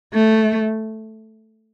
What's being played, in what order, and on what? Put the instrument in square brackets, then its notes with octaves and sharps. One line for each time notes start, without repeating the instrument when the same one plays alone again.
[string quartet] A3